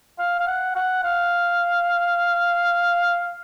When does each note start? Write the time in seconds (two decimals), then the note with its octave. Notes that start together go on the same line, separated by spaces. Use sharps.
0.19 F5
0.40 F5
0.47 F#5
0.75 F#5
1.04 F5